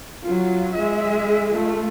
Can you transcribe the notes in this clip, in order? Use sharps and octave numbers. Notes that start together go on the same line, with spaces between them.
F#3 F4
G#3 E5
A3 F4